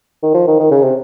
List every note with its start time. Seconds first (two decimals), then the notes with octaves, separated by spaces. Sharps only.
0.22 D#3
0.34 F3
0.47 D#3
0.59 D#3
0.71 C#3
0.82 C3